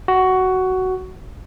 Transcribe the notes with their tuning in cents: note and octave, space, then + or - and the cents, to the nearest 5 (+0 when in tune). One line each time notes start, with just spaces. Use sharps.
F#4 +10